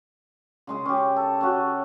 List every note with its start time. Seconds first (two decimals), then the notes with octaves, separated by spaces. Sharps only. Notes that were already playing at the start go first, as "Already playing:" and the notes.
0.67 C#3 G#3 G#4
0.85 C#4 G4
1.16 A4
1.41 C#4 F#4